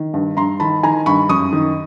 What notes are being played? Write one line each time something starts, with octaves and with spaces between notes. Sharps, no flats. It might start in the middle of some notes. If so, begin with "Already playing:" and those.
Already playing: D#3
G2
G2 A#5 C6
D#3 A5 B5
D#3 G#5 A#5
G2 B5 C#6
F#2 C#6 D#6
D#3